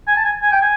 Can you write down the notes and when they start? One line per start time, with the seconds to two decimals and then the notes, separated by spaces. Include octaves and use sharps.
0.07 G#5
0.16 A5
0.24 G#5
0.42 G#5
0.52 G5
0.61 G#5